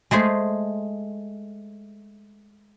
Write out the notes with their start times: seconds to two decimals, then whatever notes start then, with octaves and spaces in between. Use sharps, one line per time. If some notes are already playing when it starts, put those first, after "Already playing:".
0.11 G#3 A3 G#4 C5